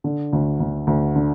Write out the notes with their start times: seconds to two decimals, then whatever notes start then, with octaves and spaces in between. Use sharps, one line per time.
0.04 D3
0.33 D2
0.60 D2
0.87 D2
1.16 D3